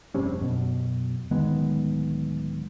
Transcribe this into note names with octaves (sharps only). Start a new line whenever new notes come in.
F1 G2 C3 C#4
F#2 B2
D1 D#3 G#3 B3